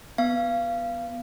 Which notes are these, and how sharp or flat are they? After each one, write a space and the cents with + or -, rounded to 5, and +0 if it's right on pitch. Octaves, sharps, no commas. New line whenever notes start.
B3 +0 F5 -20